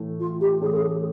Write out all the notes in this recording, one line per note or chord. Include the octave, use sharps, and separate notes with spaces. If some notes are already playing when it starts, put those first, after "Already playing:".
Already playing: A2 E3 A3
F4
G4
A2 E3 A3 C#4 G#4
A4
G#4